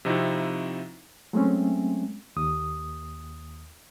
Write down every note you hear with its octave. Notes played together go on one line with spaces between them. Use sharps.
C3 F3 C4 D#4 E4 F#4
F#3 G#3 A3 C4 C#4
D#2 D#6